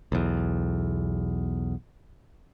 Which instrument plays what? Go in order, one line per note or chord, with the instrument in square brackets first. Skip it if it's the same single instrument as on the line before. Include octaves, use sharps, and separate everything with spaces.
[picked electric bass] B1 E2